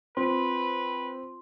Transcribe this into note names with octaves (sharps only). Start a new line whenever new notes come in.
C4 F4 B4 C6